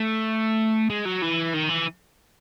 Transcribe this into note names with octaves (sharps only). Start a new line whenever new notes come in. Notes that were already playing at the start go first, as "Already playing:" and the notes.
Already playing: A3
G#3
F#3
E3
D#3
E3